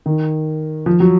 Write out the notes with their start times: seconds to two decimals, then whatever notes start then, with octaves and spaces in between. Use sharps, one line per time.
0.06 D#3
0.86 F3
1.00 F#3